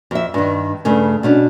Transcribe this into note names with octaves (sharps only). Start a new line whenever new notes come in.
F2 E5
G2 D#3
G2 C#3 A3
B2 C#4 D4